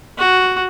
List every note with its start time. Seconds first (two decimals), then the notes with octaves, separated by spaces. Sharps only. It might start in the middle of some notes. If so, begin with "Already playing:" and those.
0.18 F#4